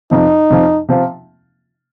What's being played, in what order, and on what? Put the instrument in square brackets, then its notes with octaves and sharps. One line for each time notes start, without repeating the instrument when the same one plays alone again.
[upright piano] F2 C3 F3 [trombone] D#4
[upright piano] F2 C3 F3
C3 F3 C4 F4